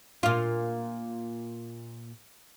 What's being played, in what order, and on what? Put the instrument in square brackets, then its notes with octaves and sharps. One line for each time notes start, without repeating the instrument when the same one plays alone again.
[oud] A#2 F4